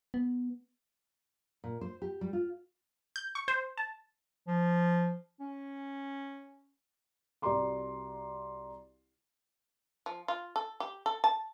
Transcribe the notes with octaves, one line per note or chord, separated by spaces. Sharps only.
B3
A#2
C5
G4
G3
F4
G6
C#6
C5
A5
F3
C#4
C2 F#4 D5 A#5 C6 D6
F3
F4
A4
G4
A4
A5